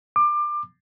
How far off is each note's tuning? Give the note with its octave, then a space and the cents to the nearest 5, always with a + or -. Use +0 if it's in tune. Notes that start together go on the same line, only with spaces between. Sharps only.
D6 +25